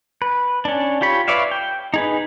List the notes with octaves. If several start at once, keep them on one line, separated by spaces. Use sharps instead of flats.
B4
C#4 D4
F4 G4 C#5 B5
B4 C#5 D5 E5 F5
G5
D#4 G#4 B4